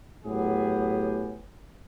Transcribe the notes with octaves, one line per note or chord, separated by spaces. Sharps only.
A2 F#3 B3 G4 G#4